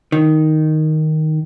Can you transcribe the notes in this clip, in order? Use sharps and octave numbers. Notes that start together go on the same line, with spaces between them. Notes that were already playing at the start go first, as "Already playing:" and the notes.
D#3